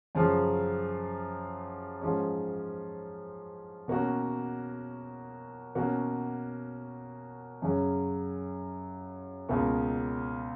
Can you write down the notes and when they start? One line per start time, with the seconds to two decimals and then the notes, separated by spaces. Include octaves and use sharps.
0.15 F#2 C#3 F3
2.01 G#2 F3 G#3 C#4
3.88 B2 A#3 C#4 F#4
5.75 B2 A#3 C#4 F#4
7.62 F#2 C#3 F#3 C#4
9.49 C#2 B2 A#3 C#4